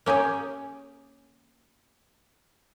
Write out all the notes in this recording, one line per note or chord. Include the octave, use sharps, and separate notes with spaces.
A#3 C#4 G4 G#4